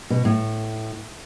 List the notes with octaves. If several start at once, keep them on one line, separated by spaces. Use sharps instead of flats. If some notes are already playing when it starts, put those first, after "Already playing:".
B2
A2